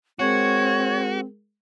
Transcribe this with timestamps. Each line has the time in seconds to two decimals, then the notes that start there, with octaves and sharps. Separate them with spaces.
0.19 G#3 C4 F#4 G#4 A#4 C#5